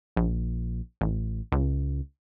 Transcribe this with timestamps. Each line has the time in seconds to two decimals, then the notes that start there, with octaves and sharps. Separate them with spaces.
0.16 A#1
1.01 A1
1.52 C#2